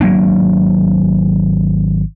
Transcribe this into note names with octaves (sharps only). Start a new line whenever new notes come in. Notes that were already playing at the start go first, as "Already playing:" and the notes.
G#1 F#3 A#3 D4